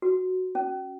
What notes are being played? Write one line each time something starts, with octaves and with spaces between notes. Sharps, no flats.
F#4
C#4